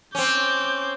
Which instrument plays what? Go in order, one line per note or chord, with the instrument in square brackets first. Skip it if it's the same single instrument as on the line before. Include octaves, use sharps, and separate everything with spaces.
[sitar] C4 C#4 [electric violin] D6 G6